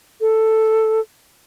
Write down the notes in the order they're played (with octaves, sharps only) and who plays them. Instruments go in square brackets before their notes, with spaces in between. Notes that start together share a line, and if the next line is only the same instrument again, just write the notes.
[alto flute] A4